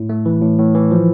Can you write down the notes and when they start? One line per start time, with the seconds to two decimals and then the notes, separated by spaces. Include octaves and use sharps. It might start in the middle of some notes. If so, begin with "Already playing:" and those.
Already playing: A2
0.09 A3
0.26 E3
0.42 A2
0.58 A2
0.75 E3
0.91 F3